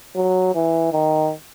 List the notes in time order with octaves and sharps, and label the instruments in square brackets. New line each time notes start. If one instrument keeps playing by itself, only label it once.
[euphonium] F#3
E3
D#3